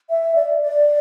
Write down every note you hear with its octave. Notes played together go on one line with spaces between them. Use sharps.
E5
D5
D5